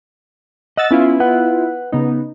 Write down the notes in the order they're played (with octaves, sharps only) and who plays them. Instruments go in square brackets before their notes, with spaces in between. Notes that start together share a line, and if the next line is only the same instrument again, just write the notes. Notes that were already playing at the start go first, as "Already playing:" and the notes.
[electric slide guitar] D#5 [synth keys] F#5 E6 A6
[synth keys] B3 E4 F4 [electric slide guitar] C#4
[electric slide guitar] B4 F#5
[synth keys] C#3 B3 D#4